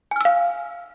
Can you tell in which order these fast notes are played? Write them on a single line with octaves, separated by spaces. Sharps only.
G#5 F6 E6 F5